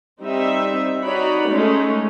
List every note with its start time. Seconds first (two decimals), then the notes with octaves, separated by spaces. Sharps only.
0.21 G3 C4 D#4 E5
1.03 D#4 F#4 C#5 D5 B5
1.49 G#3 A3 C#4 D#4